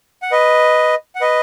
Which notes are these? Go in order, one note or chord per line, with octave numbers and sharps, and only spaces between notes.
F#5
B4 D#5
F#5
B4 D#5